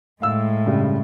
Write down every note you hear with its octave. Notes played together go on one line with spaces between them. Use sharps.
A2 G#3 F5 E6
G2 C#3 G3